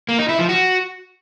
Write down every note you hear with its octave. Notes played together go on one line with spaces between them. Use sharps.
A#3
D#4
E4
F3
F#4